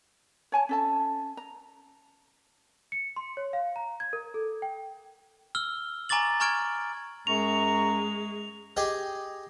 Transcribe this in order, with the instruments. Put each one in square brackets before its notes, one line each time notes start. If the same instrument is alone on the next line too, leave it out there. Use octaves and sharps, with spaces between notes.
[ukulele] C#5 G#5 A5
C#4 A4 A5
A#5
[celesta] C#7
C6
C#5
F5
A#5
G#6
A#4
A4
G5
[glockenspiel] E6 F6 G7
G#5 A#5 C#6 D6 A6 F#7
G#5 A#5 C#6 F6 G#6 D7
[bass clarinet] F#2 [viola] G#3 [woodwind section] A#5 C#6 [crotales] F7
[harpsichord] G4 G#4 D#5 G5